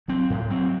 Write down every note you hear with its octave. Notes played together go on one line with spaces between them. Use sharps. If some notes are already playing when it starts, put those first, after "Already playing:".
F#3 C4
A2
F#3 C4